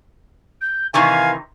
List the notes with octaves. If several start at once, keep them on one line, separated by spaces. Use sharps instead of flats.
G6
C3 D#3 E3 F5 G#5